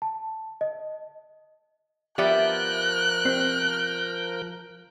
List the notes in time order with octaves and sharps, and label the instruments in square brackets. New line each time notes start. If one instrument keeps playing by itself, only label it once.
[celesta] A5
D#5
[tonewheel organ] F3 A#4 G6 [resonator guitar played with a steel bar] B3 E5 [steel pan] G4 D5 [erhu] F#6
[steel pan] C4